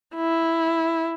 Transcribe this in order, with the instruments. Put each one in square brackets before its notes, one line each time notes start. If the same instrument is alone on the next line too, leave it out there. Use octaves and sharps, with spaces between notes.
[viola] E4